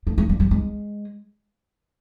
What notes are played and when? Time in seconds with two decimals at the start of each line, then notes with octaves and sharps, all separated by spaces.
0.07 A3
0.18 G#3
0.29 G3
0.40 G3
0.51 G#3